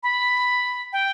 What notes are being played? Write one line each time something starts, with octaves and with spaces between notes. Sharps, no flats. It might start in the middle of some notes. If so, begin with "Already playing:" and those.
B5
G5